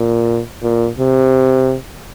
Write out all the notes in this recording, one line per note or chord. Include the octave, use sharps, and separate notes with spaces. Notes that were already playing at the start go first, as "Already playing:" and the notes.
Already playing: A#2
A#2
C3